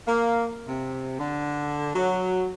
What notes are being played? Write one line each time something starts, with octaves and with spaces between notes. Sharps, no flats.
A#3
C3
D3
F#3